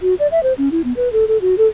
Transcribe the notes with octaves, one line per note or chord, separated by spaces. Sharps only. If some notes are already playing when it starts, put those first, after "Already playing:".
F#4
D5
E5
C5
C#4
E4
B3
B4
A4
A4
F#4
A4